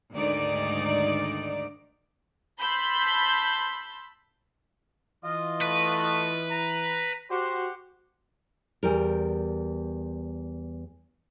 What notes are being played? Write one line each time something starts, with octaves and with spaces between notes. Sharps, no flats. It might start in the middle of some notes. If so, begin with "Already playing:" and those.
D2 G#2 D#3 D#4 D5
A5 B5 C6 E6 G6 B6
E3 F4 D#5
A3 B4
A#5
F#4 G4 C5 F#5
E2 G3 A#4